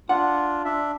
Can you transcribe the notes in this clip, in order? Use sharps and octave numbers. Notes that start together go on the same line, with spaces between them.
D4 F4 F#5
D4 E5